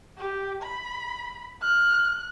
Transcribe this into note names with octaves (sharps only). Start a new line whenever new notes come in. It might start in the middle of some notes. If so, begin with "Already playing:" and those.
G4
B5
F6 F#6